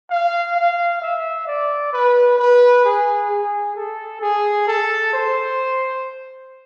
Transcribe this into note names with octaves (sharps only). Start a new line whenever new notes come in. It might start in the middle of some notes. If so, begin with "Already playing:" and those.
F5
F5
E5
D5
B4
B4
G#4
G#4
A4
G#4
A4
C5